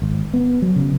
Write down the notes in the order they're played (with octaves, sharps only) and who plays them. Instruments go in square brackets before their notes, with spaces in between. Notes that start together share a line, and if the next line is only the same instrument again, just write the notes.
[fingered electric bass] G#1
B3
F#3
C#3